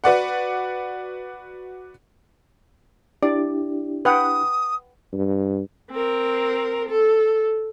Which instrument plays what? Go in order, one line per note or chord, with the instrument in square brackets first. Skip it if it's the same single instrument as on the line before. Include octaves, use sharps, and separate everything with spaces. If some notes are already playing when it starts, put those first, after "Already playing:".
[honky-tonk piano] F#4 B4 D5 F#5
[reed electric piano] D4 E4 G4 [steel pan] D5
[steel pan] B4 F#5 G5 [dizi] D#6
[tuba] G2
[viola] C4 A#4
A4